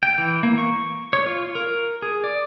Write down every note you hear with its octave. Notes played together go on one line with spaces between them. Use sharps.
G5
E3
A#3
C#6
C#5
F4
A#4
G#4
D5